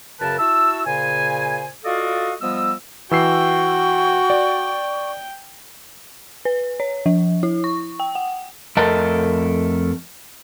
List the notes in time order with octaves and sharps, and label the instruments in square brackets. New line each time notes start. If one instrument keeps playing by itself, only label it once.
[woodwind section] F#2 C#3 A#4 B4 A5
E4 F#4 A5 E6
A#2 C#3 C5 G#5
F4 F#4 A4 D5 D#5 F5
F3 G3 B3 D#5 E6
[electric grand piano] E3 E6 C7 [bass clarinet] F#4 [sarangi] G5 [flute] C#6
[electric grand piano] D5
[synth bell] B4
C#5
F3
E4
C#6
G5
F#5
[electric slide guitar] F2 A3 A#4 D#5 A5